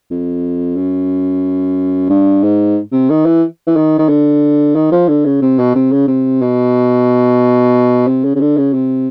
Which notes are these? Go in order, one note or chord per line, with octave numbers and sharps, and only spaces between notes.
F2
F#2
G2
G#2
C3
D#3
E3
E3
D#3
D#3
D3
D#3
F3
D3
C#3
C3
B2
C3
C#3
C3
B2
C3
C#3
C#3
D3
C#3
C3